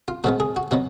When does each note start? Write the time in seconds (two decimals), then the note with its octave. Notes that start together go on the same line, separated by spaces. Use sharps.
0.08 F4
0.24 A#2 F3 G#3 B3 F#4
0.40 G#4
0.56 F#4
0.71 B2 F#3 B3 F#4